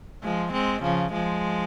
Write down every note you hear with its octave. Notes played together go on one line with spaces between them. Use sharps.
F3 G#3
G#3 C4
C#3 F3
F3 G#3